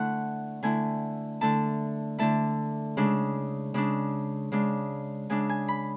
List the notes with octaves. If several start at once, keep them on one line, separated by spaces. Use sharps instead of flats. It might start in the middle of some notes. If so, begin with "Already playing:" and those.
Already playing: D3 A3 E4 F#5
D3 A3 E4 G#5
D3 A3 E4 A5
D3 A3 E4 A5
C#3 G#3 D4
C#3 G#3 D4
C#3 G#3 D4
C#3 G#3 D4 G#5
G#5
B5